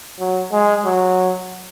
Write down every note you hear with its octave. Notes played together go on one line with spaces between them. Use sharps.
F#3
G#3
F#3